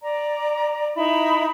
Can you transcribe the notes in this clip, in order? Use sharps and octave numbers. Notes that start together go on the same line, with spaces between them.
D5 A#5
D#4 E4 B5